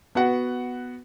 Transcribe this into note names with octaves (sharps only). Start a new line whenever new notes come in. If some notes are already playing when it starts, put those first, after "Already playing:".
B3 F#4 F#5